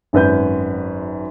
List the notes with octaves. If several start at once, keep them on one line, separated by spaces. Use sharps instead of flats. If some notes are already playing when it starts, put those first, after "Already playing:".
G#1 F#2 B4 G6